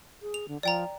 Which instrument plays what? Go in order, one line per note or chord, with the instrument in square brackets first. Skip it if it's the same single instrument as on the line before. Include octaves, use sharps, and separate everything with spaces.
[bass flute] G#4
[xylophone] F7
[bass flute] D3
[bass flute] F3 [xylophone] D5 G5 A#5